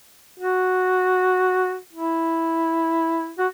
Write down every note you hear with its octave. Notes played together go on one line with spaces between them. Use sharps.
F#4
E4
F#4